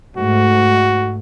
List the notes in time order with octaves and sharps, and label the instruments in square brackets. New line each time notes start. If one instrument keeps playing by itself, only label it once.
[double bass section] G#2 A3 [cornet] F#4